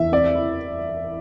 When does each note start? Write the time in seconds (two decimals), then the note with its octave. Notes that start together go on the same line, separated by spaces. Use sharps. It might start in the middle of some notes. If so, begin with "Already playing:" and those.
Already playing: E2 E5
0.12 C4 D5
0.35 E4